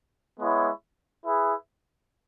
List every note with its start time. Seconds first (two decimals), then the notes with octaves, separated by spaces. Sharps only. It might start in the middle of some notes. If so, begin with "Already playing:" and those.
0.39 G#3 B3 E4 C#5
1.25 E4 G#4 B4 E5